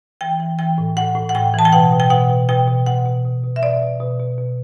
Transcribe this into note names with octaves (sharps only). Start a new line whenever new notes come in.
E3 G5
E3
E3 G5
A2
A2 F#5
A2
F#5
A2 G5
E3 A5
G5
B2 F#5
B2
G5
B2 F#5
B2
B2 G5
B2
B2 F#5
B2
B2
B2
E5
B2 D5
B2
B2
B2
B2